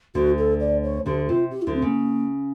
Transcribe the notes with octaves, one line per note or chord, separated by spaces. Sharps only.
D2 D3 F#4
A4
D5
C#5
D2 D3 G4
C3 F4
G4
E4
D2 D3
C4
C#3 A#3